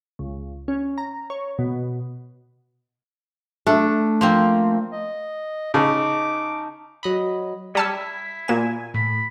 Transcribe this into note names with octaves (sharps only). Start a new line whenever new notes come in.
C#2
C#4
A#5
C#5
B2
A3 D4
F3 A#3 C4
D#5
C#3 D#4 A5 D6
F#3 D#5 B5
G3 C#4 A5 E6 B6
E4
A#2 A#3 G#5 E7
A2 B5